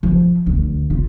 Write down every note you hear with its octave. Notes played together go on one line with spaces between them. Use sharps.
F3
D2
F4